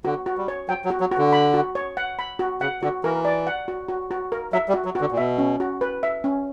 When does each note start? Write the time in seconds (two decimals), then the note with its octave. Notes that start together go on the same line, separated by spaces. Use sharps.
0.05 D3 F#4
0.26 F#4
0.37 G3
0.48 C#5
0.68 F#3 G5
0.85 F#3
0.90 F#4
1.00 F#3
1.12 F#4
1.18 D3
1.33 B5
1.54 F#4
1.75 C#5
1.97 F#5
2.19 B5
2.39 F#4
2.61 C#3 F#5
2.82 D3 F#4
3.04 E3 A#4
3.25 D5
3.47 F#5
3.68 F#4
3.88 F#4
4.11 F#4
4.32 A#4
4.53 F#3 E5
4.68 G3
4.74 F#4
4.85 F#3
4.95 F#4
5.01 D3
5.11 A#2
5.17 B2 E5
5.38 C#4
5.60 F#4
5.81 B4
6.03 E5
6.24 C#4